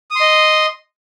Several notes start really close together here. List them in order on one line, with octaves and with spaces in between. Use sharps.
D#6 C6 D#5